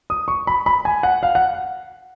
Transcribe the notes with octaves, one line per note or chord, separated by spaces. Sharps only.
D#6
C#6
B5
B5
G#5
F#5
F5
F#5